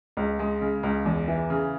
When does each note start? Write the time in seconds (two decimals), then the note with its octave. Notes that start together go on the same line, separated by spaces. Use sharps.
0.17 C#2
0.39 G#3
0.61 C#3
0.83 C#2
1.06 E2
1.28 E3
1.50 C#3